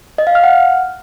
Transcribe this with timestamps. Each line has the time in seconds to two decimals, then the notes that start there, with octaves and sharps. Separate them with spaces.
0.18 D#5
0.27 F5
0.35 F6
0.44 F#5